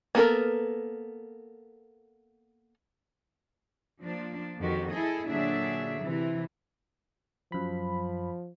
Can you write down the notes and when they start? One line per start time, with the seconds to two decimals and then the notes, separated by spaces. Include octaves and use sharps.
0.15 A#3 B3 A4 A#4
4.02 F3 A#3 D4
4.58 F2 D#3 F#4 G4
4.89 E4 G#4 A4 D#5
5.27 A#2 D3 F#3 D4 G#4 E5
6.02 C3 E3
7.52 F#2 F3 B5